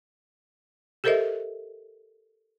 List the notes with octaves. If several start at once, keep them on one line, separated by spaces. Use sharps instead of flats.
G4 A4 A#4 C5 D#5 E5